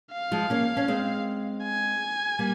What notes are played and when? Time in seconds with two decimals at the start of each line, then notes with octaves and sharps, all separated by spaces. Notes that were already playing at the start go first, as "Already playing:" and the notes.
0.12 F5
0.31 F3 G#3
0.50 A#3 C#4
0.77 C#4
0.88 G#3 C4
1.63 G#5
2.39 G3 A#3